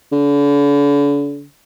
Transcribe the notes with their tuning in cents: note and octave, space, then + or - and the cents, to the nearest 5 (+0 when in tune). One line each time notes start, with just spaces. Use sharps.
D3 -40